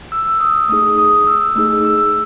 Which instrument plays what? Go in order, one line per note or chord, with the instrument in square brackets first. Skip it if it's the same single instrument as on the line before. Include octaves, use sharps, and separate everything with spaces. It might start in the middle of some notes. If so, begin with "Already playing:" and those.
[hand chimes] E6
E6
D#6
A3 D#4 G#4 D#6
D#6
E6
A3 D#4 G#4 E6
E6